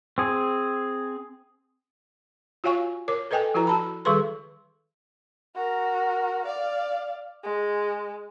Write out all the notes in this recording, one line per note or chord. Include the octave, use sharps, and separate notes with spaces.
C4 G#4
F4 F#4 C#5 F5 G#5 C#6
A#4 C#5 D6
A4 B4 D#5 G5 G#5
F3 E4 F#4 B4 A#5
F#4 A5 B5
D#3 G3 G#4 A4 B4 C6
F#4 A#4
D5 F5
G#3